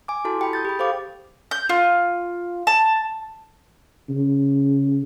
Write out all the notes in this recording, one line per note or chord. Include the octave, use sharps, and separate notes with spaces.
G#5 D6
E4 F#4 A4 A5 C6
G4 G5 B5
D#6 G6 A6
G4 G#4 B5
G4 A4 C5 F5 G5 D6
G6
F4
A5
C#3